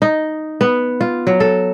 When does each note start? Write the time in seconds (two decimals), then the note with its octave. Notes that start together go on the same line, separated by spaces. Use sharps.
0.02 D#4
0.61 B3
1.01 F4
1.27 F#3
1.40 A4